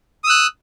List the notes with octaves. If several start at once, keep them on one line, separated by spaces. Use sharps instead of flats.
D#6 E6 F#6